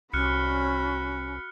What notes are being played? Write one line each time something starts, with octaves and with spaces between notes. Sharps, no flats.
C2 C#4 F#4 B5 F6 F#6 C#7